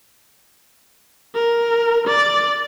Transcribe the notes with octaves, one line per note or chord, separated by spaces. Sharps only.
A#4
D5